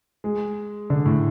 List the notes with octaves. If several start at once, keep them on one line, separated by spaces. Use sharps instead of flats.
G#3
D3
A2